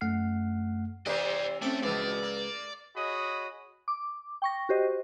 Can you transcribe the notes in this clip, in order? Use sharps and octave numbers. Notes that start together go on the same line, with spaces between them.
F#2 A3 F#5 F6 C7
C3 E3 G4 B4 C5 D5 D#5
A2 A3 C4 C#4 D6
C#2 B2 E3 F3 B4 D5
A#3
F#4 G#4 C#5 D#5 B5 D#6
D6
G5 C#6 A#6
F#4 G4 C5 D#5